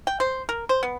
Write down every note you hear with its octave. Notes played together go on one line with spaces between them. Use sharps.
G5
C5
A#4
C5
B3